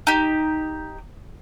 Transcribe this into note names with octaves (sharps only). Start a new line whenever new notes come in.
D#4 G4